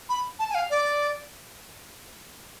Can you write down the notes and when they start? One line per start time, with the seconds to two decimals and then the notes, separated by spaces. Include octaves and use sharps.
0.09 B5
0.39 A5
0.50 G#5
0.55 F5
0.70 D5